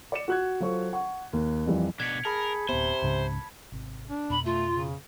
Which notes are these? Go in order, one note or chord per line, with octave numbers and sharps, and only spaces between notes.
D5 C#7 E7
F#4 F#6 G#6
F#3 F4 A4 C5 C#6
F#5 C#6
D#2
F2 E3 F3 G3
B2 D4 G#6 B6 C#7
G#4 A#4 A5 B5
D1 C3 B3 C5
C#2 G#2 C#3
G#1 C3
D4
F2 B2 B3 B5
A3 F4
C#3